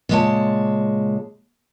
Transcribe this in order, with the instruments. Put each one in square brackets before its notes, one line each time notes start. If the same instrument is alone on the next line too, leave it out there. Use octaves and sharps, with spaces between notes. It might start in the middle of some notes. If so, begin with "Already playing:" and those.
[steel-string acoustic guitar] A#2 C#3 G#3 B4 C#5 A5